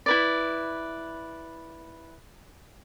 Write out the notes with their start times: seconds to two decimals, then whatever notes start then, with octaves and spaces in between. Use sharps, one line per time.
0.06 E4 B4 D5